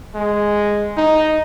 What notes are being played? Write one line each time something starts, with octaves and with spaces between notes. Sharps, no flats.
G#3
D#4